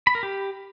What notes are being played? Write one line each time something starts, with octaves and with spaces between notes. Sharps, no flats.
B5
A#4
G4